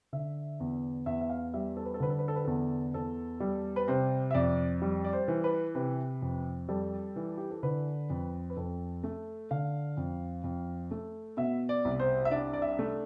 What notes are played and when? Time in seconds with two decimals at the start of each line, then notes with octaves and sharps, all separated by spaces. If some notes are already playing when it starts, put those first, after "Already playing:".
0.13 D3 E5
0.60 E2
1.06 E2 E5
1.21 E5
1.29 F5
1.54 G3 E5
1.77 A4
1.85 B4
1.94 A4
2.00 D3 B4
2.10 A4
2.19 B4
2.28 A4
2.36 B4
2.45 E2 A4
2.94 E2 A4
3.40 G3
3.76 B4
3.88 C3 C5
4.31 E5
4.34 F2 D5
4.82 G3
5.04 D5
5.13 C5
5.28 E3
5.44 B4
5.75 C3 B4
6.22 F2
6.68 G3 A4
7.16 E3
7.37 G4
7.51 A4
7.63 D3 B4
8.10 F2
8.50 B4
8.56 F2 A4
9.04 A3
9.51 D3 F5
9.97 F2
10.44 F2
10.91 A3
11.37 B2 E5
11.69 D5
11.85 C2
12.00 C5
12.25 E5
12.31 D4 D5
12.53 D5
12.62 E5
12.79 A3